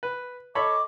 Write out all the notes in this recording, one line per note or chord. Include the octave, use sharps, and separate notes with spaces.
B4
A4 C#5 D#5 B5 C#6 D6